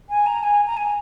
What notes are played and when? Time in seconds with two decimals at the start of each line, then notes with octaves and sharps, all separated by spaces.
0.09 G#5
0.26 A#5
0.43 G#5
0.66 A#5
0.76 G#5